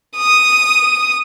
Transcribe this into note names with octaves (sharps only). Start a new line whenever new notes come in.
D#6